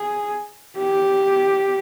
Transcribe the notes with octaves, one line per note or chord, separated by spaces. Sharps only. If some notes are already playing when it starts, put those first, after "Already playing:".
Already playing: G#4
G4